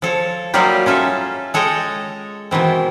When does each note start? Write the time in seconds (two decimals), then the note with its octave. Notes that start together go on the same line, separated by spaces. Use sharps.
0.02 F3 A4 C#5
0.54 F#3 G3 A#3 D#4 F4 G4
0.86 C#4 F4 A4 E5
1.54 G#3 A4 C#5 D#5 G5
2.51 B2 D#3 E3 C4